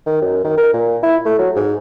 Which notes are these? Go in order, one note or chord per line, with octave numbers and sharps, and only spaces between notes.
D#3
F#2
D#3
A#4
A#2
E4
A3
F#3
G#2